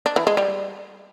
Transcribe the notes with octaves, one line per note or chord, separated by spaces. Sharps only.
D4
E3
G#3
G3